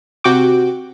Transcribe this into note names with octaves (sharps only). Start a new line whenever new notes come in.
C3 F#4 G5 D6